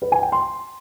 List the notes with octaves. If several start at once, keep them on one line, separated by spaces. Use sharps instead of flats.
B4
G#5
G5
C6